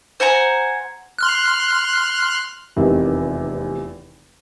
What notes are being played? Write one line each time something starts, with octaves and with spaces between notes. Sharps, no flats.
C5 F#5 G#5 A#5
C6 F6 F#6
F1 E2 C3 D#3